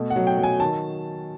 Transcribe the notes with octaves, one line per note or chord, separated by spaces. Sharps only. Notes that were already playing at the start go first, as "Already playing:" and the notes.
Already playing: B2 A3
F#5
F#3
G5
F#3
G#5
D#3 A5